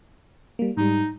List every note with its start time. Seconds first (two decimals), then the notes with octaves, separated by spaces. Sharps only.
0.59 G3 A#3
0.77 G#2 G3 D#4